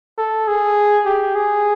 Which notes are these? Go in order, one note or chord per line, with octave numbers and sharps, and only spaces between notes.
A4
G#4
G4
G#4